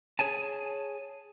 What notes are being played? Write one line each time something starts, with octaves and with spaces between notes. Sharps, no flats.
G#4 C#5 G#5 A5